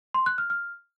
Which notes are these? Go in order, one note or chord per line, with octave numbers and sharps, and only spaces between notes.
C6
F#6
F6
F6